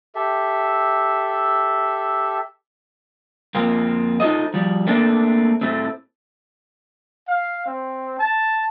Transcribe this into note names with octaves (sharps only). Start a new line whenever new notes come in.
G4 A4 E5
F2 A#3 C4 F4
D#4 F4 A4 C5 D#5
F3 G3
A3 A#3 C4 D4 A4
A2 A3 C4
F5
C4
A5